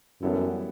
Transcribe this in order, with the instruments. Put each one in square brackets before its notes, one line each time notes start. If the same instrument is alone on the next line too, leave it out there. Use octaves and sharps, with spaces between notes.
[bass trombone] F#2 [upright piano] E3 G3 B3 E4 A4